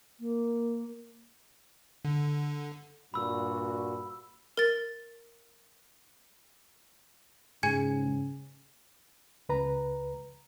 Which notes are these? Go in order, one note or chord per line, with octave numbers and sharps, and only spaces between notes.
A#3
D3
G2 A#2 F#4 B5 E6
A#4 A6
G#2 C#3 G#4 G#5 G#6
C#2 B4 A#5